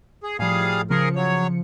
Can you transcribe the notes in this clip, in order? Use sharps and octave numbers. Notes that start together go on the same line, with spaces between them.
G#4
A2 F3 G3 G#4 F5
C#3 F3 G#4 A#4 C#7
F#3 C#5